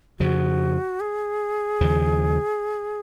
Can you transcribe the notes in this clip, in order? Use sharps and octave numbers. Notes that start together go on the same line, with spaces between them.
F2 C#3 F3 F#4
G#4
D#2 C#3 F3